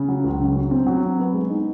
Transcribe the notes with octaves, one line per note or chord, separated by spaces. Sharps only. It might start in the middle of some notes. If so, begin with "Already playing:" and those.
Already playing: C#3
F#3
C#2
C#3
F#3
C4
F#3
C4
B3
G#3
D#4